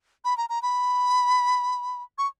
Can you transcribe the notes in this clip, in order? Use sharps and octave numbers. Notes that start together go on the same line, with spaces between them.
B5
A#5
A#5
B5
C#6